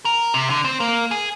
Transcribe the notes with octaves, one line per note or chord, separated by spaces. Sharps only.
A#4
C3
D3
C4
A#3
G#4